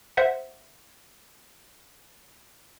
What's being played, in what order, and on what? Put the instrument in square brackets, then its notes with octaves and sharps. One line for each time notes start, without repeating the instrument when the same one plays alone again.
[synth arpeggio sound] C5 E5 F#5